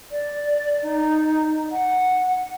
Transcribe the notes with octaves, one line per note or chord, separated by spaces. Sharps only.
D5
D#4
F#5